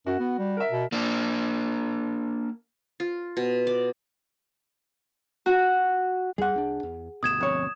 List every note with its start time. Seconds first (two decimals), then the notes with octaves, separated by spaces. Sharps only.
0.06 F#2 F#4
0.20 B3
0.38 G3
0.57 A#4 E5
0.71 B2
0.92 A#3 D4
3.00 F4
3.37 B2
3.67 D5
5.46 F#4
6.38 E2 G3 G#4 F#5
6.54 C2 C#4 D4
6.83 E2
7.23 G1 D2 B2 D#6 G#6 E7
7.41 F2 C#5